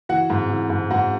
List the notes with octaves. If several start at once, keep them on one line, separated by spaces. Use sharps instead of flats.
E3 F#4 F#5
G#2
E3
G#2
G#2 F#4 F#5